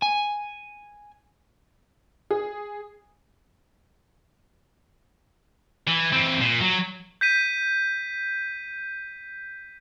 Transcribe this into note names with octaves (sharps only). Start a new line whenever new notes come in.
G#5
G#4
E3
E3 C4
A#2
F#3
G6 B6 D#7